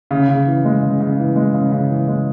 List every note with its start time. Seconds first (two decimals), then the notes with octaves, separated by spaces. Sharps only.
0.11 C#3
0.29 C#3
0.46 E3
0.65 G#3
0.82 C#3
1.00 C#3
1.19 E3
1.36 G#3
1.54 C#3
1.72 C#3
1.90 E3
2.08 G#3